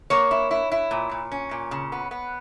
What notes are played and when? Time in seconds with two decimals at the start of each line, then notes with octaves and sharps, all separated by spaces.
0.10 A#3 C#5
0.31 E4
0.51 E4
0.72 E4
0.91 A#2
1.11 A#2
1.32 C#4
1.51 A#2
1.71 C#3
1.92 B3
2.11 B3